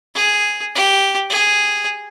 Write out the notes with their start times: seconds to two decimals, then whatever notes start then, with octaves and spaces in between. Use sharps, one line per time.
0.15 G#4
0.76 G4
1.30 G#4